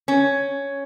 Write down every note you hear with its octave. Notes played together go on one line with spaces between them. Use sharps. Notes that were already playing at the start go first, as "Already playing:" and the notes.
C#4